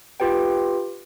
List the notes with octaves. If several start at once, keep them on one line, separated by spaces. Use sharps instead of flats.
F4 G4 B4 G5